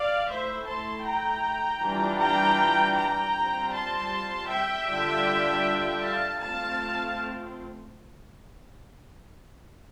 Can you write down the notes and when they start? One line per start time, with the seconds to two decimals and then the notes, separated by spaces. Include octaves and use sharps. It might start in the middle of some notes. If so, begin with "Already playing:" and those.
Already playing: D5 F5
0.29 A3 E4 C5 E5
0.67 A5 C6
1.05 G5 A#5
1.82 E3 G3 D4 F4
2.20 G5 A#5
2.96 G5 A#5
3.34 G3 C4 F4
3.73 A5 C6
4.49 E5 G5
4.87 D3 G3 D4 F4
6.02 F5 A5
6.40 A3 C4 F4 F5 A5